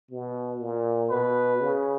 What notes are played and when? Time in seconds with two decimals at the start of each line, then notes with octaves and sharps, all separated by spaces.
0.11 B2
0.60 A#2
1.10 B2 B4
1.61 C#3